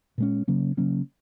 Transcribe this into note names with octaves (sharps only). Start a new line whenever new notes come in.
A#2 G#3 C#4
C#3 F#3 A#3 C#4
C#3 F#3 A#3 C#4